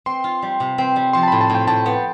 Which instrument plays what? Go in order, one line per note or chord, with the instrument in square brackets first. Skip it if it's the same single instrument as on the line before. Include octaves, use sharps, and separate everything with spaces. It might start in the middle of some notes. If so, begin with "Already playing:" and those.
[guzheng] C4 [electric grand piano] C6
[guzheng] F4
G3
C3
C4
G3
[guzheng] F3 [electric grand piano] C6
[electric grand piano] A5
B5
[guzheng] A2
[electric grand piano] A5
[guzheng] A2 [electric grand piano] G5
[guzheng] A2 [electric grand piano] A5
[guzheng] B3